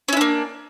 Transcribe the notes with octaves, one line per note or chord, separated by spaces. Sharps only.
A#3 C#4 D4 E4